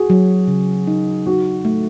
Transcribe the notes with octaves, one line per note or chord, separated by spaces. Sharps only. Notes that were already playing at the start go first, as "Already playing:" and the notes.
Already playing: F#4 G#4
F#3
C#3
D#4
D#4 F#4
A3